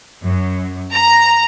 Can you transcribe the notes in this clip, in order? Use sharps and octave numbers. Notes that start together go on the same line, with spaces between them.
F#2
A#5